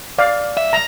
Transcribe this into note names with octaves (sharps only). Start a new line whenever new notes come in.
D5 F5
C2 E5
A#5